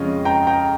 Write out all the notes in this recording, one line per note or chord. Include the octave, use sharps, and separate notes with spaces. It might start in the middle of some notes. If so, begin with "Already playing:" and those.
Already playing: F2 C#3 G#3 C#4 F4 D#5
G5 A#5
G5 A#5